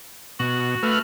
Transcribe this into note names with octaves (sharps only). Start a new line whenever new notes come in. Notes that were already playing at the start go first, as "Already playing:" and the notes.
B2 F#4
A3 B4 F6